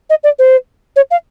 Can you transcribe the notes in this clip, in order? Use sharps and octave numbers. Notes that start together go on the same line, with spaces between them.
D#5
D5
C5
C#5
F5